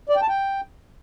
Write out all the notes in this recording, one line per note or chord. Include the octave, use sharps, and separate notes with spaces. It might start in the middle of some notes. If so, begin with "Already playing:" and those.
D5
G5
A5
G5